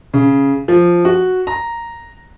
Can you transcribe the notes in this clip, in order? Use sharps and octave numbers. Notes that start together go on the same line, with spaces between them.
C#3
F3
F#4
A#5